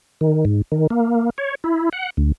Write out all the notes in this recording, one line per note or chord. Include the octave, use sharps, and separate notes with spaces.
D#3
G#2
D#3
A#3
C#5
E4
F#5
D2